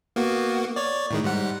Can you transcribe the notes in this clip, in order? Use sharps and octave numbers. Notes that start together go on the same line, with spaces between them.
A#3 B3 F#4
C#5 D5
A2 D#3 G#3
G#2 G3 F#5